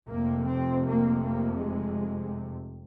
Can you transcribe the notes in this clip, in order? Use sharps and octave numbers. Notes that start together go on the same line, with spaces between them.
F1 F2 C3 A#3
C4
A#3
A#3
G#3